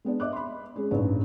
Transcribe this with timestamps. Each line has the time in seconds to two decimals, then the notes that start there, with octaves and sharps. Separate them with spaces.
0.05 G#3 B3 D4
0.20 D#5 E5 D6 F#6
0.33 B5 C6
0.76 G#3 C#4 G#4
0.91 A1 G2 A#2 D#4 B4 C#5